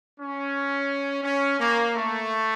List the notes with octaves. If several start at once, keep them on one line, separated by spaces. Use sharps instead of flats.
C#4
C#4
A#3
A3